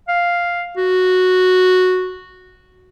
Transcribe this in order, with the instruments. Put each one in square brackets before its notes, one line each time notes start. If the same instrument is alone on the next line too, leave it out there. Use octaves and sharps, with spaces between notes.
[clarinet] F5
F#4